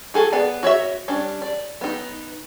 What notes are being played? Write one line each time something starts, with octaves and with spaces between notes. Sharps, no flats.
F#4 G#4 A4
B3 G#4 D5 F#5
F#4 C#5 D#5 E5
G3 C#4 D4
D5
B3 D#4